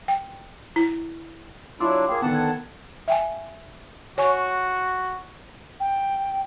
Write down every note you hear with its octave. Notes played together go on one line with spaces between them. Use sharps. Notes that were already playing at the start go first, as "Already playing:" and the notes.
G5
E4
F#3 D4 E4 F4 C6 D6 E6
A#3 G#4 A#4 G5
D3 D#3 B3 F#5 A5
G#6
E5 G5 G#5
F#4 C#5 G#5 C#6
G5